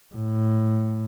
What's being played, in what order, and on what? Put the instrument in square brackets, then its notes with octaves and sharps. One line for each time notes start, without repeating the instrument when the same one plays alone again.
[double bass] A2